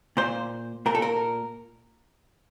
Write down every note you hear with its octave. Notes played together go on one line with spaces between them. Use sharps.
A#2 C5
A#2 A#4
A4
A#4